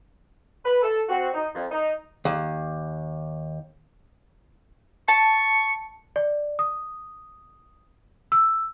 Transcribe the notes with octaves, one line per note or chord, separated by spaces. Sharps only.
B4
A4
C4 F#4
D#4
F2
D#4
D#2
A5 C#6
D5
D#6
E6